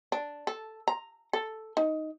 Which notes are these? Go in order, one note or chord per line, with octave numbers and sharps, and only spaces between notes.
D4
A4
A#5
A4
D#4